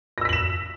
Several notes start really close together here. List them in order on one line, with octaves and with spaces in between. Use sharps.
A#6 E6 B6 F#7 E7